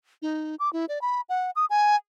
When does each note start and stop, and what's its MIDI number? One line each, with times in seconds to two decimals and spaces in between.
0.22 0.56 63
0.60 0.72 86
0.73 0.85 64
0.89 1.01 74
1.02 1.21 83
1.29 1.51 78
1.56 1.66 87
1.70 1.96 80